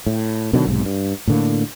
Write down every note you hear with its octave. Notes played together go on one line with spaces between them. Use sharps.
A2
B2 D3 D#3 F#3
B1 G#2 C3
G2
A2 D3 A#3